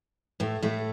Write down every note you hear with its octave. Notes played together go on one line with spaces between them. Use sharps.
A2 A3
A2 A3